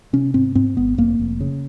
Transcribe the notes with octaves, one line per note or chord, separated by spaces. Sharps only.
C3 C#4
G#2 C4
G#2 C4
G#1 B3
F1 A#3
F1
C#3